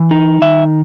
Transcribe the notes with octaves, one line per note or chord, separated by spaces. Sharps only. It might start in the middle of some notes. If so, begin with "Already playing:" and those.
Already playing: E3
D#4
D#3 E5